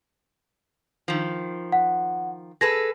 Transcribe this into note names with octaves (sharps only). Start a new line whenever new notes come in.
D#3 F3
F#5
G#4 A4 B4 A#6